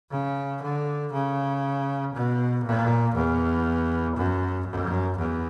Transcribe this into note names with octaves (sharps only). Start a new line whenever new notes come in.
C#3
D3
C#3
B2
A#2
E2
F#2
F#2
E2